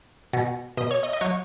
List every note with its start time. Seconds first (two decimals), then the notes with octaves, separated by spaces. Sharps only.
0.33 B2
0.77 B2 D#5
0.91 C#5
1.03 D#5
1.13 D#5
1.21 F#3 C#5